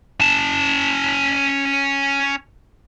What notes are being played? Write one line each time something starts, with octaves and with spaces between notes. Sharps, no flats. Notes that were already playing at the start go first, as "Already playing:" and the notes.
C#4 A5